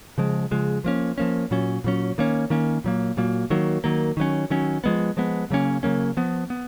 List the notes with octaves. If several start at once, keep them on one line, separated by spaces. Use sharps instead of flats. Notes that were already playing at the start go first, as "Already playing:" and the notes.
C#3 F3 G#3
C#3 F3 G#3
F3 A#3 C#4
F3 A#3 C#4
A#2 F#3 C#4
A#2 F#3 C#4
D#3 A#3 C#4
D#3 A#3 C#4
A#2 F#3 A#3
A#2 F#3 A#3
D#3 F#3 A#3
D#3 F#3 A#3
D#3 F#3 C#4
D#3 F#3 C#4
F3 G#3 B3
F3 G#3 B3
C#3 F#3 A#3 C#4
C#3 F#3 A#3 C#4
F3 B3
B3